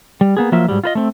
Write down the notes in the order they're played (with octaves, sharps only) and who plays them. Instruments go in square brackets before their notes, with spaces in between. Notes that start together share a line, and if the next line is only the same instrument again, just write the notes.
[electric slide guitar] G3
A#3 B3 G#4
F3 F#3 A#3 F4 E5
G#2 F#3 G3
F4 B4 D#5
A3 C4